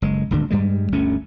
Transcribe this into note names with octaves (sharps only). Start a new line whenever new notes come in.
F#1 G#3
D#1 G#1 D2 D3
G2 G3 G#3
G1 D2 A3 C#4